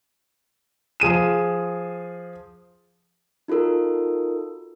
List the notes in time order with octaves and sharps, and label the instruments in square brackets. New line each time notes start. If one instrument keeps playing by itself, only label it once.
[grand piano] F3 G#4 D#7 E7
[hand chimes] D#4 F4 F#4 A4 A#4